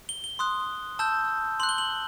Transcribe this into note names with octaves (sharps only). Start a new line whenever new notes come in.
G7
G7
C6 D#6 F#6
A5 E6 G6
C6 F#6 F#7
G7
F#7